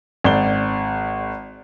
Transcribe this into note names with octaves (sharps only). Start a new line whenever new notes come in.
G#1 D5 G7